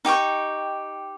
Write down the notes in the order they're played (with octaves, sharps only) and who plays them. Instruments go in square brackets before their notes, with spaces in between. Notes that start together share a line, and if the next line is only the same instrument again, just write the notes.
[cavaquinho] D#4 G4 G5 C#6